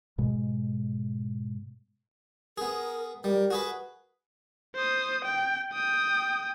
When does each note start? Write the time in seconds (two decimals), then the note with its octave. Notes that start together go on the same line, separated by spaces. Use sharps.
0.18 G#2 B2 G#3
2.58 B3 G#4 A#4
3.24 G3 A#4
3.50 F#4 G#4 B4
4.75 C5 D#6
5.25 G5
5.73 G5 D#6